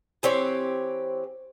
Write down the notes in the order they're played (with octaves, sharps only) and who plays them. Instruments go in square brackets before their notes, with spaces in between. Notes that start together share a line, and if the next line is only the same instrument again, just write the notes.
[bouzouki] E3 C4 G4 C#5